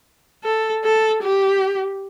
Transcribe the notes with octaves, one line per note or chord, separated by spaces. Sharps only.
A4
A4
G4